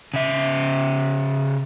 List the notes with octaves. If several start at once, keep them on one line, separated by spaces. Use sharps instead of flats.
C#3 E5